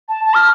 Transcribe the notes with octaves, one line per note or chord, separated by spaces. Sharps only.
A5
A5
F6